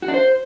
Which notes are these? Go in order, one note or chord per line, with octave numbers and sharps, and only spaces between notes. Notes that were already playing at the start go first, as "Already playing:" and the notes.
F#4
D4
C5